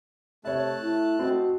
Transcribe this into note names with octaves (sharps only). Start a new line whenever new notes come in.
C3 A3 C#5 E5 A5 F#6
E4
C4 F#4 D#5